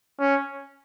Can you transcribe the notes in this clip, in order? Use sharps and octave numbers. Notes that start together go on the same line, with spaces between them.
C#4